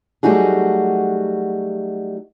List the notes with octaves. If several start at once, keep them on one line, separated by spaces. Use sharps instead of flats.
F#3 G3 A3 D#4 F#4 G#4